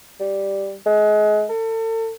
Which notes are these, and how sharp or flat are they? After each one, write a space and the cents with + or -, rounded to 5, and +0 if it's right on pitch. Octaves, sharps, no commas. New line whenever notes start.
G3 +0
G#3 +30
A4 +35